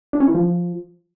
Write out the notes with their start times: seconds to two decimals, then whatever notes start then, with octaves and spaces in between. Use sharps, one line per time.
0.13 D4
0.20 C#4
0.27 E3
0.35 F3